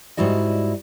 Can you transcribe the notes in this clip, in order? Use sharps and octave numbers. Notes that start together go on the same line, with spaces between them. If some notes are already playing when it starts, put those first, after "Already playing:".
G#2 G3 E4 F#4 D#5